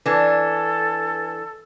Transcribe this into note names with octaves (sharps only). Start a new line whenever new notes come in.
E3 D4 A4 B4 G#5 G#6